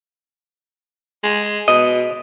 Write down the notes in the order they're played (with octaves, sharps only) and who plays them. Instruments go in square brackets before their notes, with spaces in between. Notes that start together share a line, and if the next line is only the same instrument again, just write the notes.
[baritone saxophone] G#3
[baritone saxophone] B2 [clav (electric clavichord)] D#5